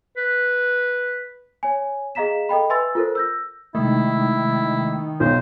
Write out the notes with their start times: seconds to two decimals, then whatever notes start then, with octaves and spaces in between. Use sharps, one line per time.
0.17 B4
1.63 C#5 G#5
2.15 G#4 D#5 F5 A#5 B6 E7
2.49 A4 D#5 G5 B5
2.70 B4 E5 G#5 C6 E6 A6
2.95 F4 A4 A#4 C5
3.15 E6 G6 A#6
3.75 C3 D#3 G#3 A3 E4
5.20 B1 D#4 F4 C5